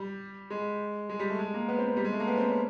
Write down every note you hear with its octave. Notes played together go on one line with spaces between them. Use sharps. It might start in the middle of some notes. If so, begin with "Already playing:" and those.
Already playing: G3
G#3
G#3
G3
A3
G#3
A#3
B3
C4
C4
G3
G#3
A3
A#3
B3
C4
C#4